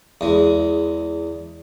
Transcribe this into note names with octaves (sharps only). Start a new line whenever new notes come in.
E2 G#3